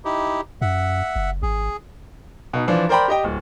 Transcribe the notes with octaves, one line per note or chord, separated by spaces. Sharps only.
D#4 E4 G4
F#2 E5 F#5
F#1
G#1 G#4
B2 D#4
E3 F3 D4
A#4 C5 D5 G5 A#5 B5
G4 D#5 G5
D1